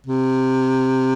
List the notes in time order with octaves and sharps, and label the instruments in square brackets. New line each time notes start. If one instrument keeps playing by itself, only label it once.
[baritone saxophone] C3